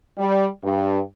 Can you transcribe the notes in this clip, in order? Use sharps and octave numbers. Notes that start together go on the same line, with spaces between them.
G3
G2